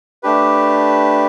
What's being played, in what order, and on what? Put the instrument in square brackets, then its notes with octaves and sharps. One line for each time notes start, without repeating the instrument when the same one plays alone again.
[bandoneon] A3 D4 G4 B4